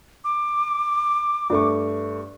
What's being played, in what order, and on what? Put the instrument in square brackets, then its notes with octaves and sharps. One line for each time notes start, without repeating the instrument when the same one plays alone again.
[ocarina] D6
[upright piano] G2 A3 C#6